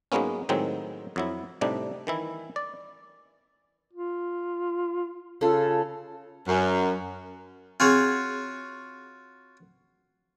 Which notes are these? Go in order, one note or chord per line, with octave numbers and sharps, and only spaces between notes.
G#2 F#3 G#3 A#3 B3 C#4
A2 D#3 F#3 G#3 C4 D#4
F2 F#3 E4
A2 C3 G3 D4 D#4
D#3 E3 E4
D5
F4
C#3 F4 A4
F#2
C4 F4 F#4 G#4 C#5